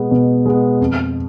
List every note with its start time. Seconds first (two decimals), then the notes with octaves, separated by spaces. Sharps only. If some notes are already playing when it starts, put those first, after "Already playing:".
Already playing: B2 G#3 B3
0.11 B2
0.46 G#3 B3
0.81 F2